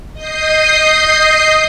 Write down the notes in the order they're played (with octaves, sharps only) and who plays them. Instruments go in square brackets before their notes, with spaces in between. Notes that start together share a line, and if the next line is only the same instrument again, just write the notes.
[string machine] D#5 D#6 G6 C7